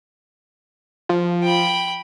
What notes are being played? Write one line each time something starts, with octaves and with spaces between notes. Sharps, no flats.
F3
G5 B5